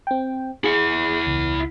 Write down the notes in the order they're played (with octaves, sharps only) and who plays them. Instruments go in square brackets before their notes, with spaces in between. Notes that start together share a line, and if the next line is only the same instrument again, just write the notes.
[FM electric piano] C4 G5
[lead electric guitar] E4 F#5 [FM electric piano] G#4
[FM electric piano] C#2